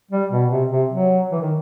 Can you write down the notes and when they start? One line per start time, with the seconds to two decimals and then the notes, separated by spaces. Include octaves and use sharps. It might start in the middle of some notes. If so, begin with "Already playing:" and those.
0.11 G3
0.31 B2
0.51 C3
0.71 C3
0.91 F#3
1.32 E3
1.41 D#3